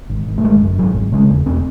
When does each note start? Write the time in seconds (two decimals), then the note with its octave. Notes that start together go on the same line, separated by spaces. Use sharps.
0.10 G#1
0.27 G#1
0.38 A3
0.44 G#1 G#3
0.60 F#2
0.78 G#1 F#3
0.95 G#1
1.12 C#3 G#3
1.29 E1
1.45 E1 C4